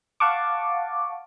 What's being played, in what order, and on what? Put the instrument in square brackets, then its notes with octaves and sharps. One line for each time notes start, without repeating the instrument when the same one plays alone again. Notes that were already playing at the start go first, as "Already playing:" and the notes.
[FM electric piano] F5 F#5 A5 C#6 D6